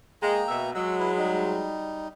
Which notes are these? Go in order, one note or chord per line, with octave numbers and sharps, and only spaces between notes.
G#3 A#3 G5 A#5
B2 E5
F#3 G#3 E6
E4 B4
G3 D#4